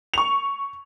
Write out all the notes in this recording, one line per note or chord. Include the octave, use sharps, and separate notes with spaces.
C#6 F7